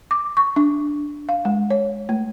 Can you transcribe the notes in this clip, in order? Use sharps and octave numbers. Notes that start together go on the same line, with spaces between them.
D6
C#6
D4
F5
G#3
C#5
A3